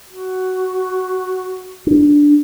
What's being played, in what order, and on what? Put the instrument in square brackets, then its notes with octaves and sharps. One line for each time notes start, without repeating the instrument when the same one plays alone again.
[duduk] F#4
[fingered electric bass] D4